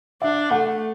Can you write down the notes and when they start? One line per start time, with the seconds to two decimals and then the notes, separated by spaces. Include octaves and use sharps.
0.22 D4 E5
0.51 A3 F#5